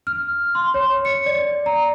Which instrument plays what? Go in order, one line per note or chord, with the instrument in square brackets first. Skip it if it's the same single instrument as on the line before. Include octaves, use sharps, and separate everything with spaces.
[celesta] F6
C6
C#5
C#7
D5
A#5